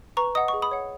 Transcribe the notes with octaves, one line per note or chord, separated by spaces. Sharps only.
B4 A#5 C#6
D#5 F#5 D#6
C#6
G#4
B5 D#6
C#5 F#5